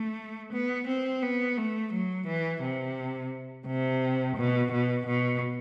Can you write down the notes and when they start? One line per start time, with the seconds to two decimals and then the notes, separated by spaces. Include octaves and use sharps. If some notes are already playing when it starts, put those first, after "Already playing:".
Already playing: A3
0.53 B3
0.88 C4
1.23 B3
1.57 A3
1.93 F#3
2.27 E3
2.63 C3
3.67 C3
4.37 B2
4.72 B2
5.07 B2